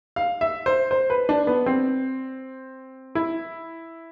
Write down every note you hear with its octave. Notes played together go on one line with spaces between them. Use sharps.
F5
E5
C5
C5
B4
D4
B3
C4
E4